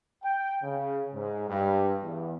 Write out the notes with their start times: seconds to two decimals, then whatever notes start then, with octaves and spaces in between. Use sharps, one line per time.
0.23 G5
0.63 C#3
1.14 G#2
1.49 G2
2.03 E2